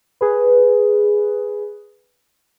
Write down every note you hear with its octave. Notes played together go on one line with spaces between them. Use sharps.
G#4 B4